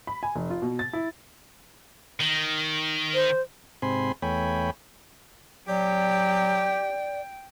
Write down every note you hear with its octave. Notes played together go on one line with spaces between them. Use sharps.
B5
G#5
F1
F4
B2
A6
E4
D#3
C5
G#2 C3 C4 G#5 B5 C6
E2 A3 C#5 G5 G#5 B5
F#3 G4 D5 G5